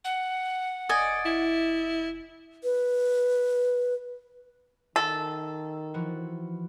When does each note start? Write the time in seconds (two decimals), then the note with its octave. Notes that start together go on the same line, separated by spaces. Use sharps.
0.05 F#5
0.89 F1 D5 D#5 G#5
1.25 E4
2.64 B4
4.96 D#3 A4
5.94 E3 F3 F#4